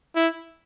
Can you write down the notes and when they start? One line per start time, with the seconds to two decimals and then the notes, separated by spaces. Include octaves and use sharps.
0.16 E4